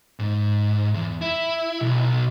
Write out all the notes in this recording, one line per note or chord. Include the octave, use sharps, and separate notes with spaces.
G#2
E2
E4
B1